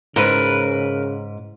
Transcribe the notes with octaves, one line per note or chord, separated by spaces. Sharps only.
G#2 C#3 A#4 B4